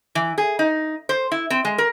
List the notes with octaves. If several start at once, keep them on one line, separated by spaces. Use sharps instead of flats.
E3
G#4
D#4
C5
E4
C4
G#3
A#4